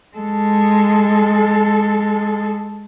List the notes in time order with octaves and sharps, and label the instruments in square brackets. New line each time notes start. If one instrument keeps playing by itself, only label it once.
[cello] G#3 A4